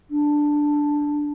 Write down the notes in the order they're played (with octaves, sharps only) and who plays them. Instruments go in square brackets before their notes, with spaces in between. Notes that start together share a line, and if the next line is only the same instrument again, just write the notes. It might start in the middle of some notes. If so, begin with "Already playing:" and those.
[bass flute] D4